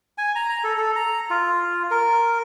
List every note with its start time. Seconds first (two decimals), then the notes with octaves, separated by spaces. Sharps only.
0.18 G#5
0.35 A#5
0.64 A4
0.78 A4
0.96 A#5
1.30 F4
1.91 A#4